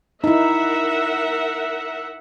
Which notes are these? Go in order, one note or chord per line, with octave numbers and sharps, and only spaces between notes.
D#4 E4 A#4 E5 F#5